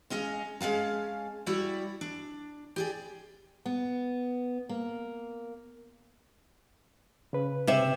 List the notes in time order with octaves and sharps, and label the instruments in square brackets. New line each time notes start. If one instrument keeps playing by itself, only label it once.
[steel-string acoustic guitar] G#3 C#4 D#5 F5
G#3 C#4 F5 A5
G3 E4 F#4 D5 E5
D4
G4 G#4 D5
B3
A#3
[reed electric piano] C#3 B4
[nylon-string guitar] C3 E5